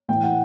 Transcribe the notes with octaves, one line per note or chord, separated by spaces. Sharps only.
A2 E3 G5
F#5